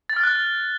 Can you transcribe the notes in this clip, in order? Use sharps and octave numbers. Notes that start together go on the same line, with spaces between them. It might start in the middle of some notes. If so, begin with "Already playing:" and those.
A6
F6
F#6